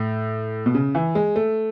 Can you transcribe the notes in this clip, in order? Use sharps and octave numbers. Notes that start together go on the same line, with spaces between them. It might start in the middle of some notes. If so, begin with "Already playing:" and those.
Already playing: A2
B2
C#3
E3
G#3
A3